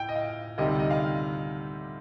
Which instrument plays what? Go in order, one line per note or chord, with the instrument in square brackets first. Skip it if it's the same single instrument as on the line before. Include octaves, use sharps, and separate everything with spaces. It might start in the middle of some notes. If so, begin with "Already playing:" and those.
Already playing: [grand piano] A2 G5
D#5
F5
D2 C3 D#3 G3 D#5
D#5
F5